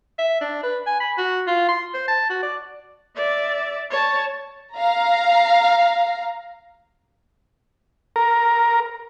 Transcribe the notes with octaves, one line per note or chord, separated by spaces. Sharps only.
E5
D4
B4
G#5
B5
F#4
F4
C6
C5
A5
F#4
D5
D5 E5
C#5 A5
F5 A#5
A#4